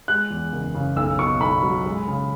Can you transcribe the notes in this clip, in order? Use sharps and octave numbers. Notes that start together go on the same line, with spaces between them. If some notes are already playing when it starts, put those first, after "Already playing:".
G#3 F#6
E2
F#1
C#3
B1 E6
B2 C#6
B1 B5
F#3
G#3
C#3